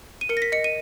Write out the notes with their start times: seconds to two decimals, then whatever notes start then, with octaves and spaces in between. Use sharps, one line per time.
0.21 D#7
0.29 A#4 C#7
0.37 A#6
0.42 B6
0.52 D#5 C#7
0.64 D#7